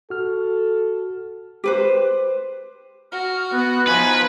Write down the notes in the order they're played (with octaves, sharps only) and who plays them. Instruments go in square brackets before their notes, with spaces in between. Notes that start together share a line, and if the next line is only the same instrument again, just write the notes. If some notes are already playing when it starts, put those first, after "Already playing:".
[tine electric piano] F#4 F6 [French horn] A4
[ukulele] G4 B4 C5
[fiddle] F#4 [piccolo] F6
[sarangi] B3 [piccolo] F#6
[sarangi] F3 [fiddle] D#4 B5 [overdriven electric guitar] B4 [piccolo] G#5